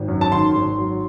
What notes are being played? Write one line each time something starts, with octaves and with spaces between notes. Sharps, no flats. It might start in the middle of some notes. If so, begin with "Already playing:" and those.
Already playing: G#1
F#2
A5
D#3 C6
G#1
F#3